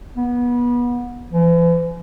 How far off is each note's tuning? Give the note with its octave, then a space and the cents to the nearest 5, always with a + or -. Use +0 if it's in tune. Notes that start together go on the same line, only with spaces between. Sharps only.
B3 -25
E3 +40